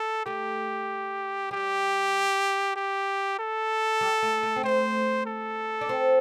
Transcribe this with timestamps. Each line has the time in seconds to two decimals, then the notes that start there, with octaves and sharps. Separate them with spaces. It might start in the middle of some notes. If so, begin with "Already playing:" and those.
Already playing: A4
0.26 A3 G4
1.51 G3 G4
2.76 G4
3.39 A4
4.01 G3
4.23 A3
4.43 A3
4.56 C4
4.63 A3 C5
5.26 A4
5.81 D4
5.89 C4